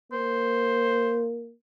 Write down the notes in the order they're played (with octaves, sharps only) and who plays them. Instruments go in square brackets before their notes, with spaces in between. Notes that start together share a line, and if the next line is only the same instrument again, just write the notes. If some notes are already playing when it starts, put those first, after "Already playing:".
[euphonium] A#3 [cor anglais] C5